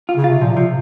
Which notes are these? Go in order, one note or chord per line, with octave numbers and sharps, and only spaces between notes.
F4
C#3
C3 F4
A#2 F3
C3 F3